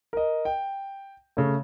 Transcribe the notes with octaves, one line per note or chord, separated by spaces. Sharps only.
A#4 D#5
G5
C#3 A3